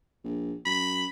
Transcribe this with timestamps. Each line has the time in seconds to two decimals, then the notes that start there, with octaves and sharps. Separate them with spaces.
0.24 A#1
0.66 F#2 B5